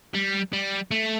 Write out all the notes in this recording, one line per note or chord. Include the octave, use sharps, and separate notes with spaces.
G3
G3
A3